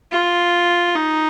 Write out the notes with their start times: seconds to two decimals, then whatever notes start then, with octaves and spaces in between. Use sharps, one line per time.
0.12 F4
0.95 D#4